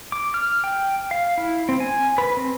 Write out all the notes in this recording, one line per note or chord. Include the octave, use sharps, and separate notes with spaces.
D6
F6
G5
F5
E4
C4
G#5
B4
C4